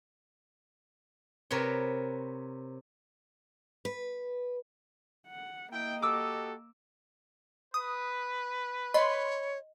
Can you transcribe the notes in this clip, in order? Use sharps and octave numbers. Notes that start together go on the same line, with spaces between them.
C3 A#4 B4 C#5
B4
F#5
A#3 E4 D#5 G5
F#4 G4 A4 D6 E6
B4 D#6
C#5 D#5 B5 C6